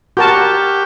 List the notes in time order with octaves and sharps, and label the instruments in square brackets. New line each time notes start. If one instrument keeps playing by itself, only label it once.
[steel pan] F#4 A#4 A5 [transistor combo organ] G4